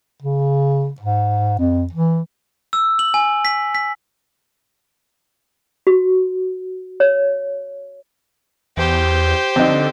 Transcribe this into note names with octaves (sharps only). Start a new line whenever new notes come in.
C#3
G#2
F2
E3
E6
F#7
G#5
B6
B6
F#4
C#5
E2 G4 C5
D3 C4 D#4